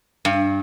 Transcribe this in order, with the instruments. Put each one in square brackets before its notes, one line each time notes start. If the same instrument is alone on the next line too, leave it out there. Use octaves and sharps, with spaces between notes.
[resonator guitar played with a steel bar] G2